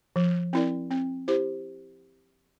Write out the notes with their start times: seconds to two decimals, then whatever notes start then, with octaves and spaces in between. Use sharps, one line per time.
0.16 F3
0.53 C4 E4 A#4 D5
0.91 C4
1.28 E4 G4 C5